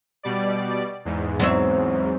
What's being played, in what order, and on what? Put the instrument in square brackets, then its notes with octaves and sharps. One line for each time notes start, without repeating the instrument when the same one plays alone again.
[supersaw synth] B2 G3 D5
E2 G#2
[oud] F#3 C4 E5